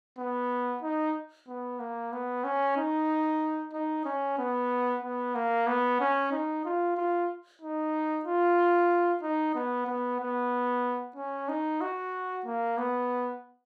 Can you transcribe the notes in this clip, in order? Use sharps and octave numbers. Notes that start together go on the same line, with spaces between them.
B3
D#4
B3
A#3
B3
C#4
D#4
D#4
C#4
B3
B3
A#3
B3
C#4
D#4
F4
F4
D#4
F4
D#4
B3
B3
B3
C#4
D#4
F#4
A#3
B3